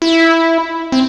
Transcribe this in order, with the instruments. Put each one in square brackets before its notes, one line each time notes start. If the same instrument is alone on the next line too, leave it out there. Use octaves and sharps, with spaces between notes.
[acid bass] E4
C4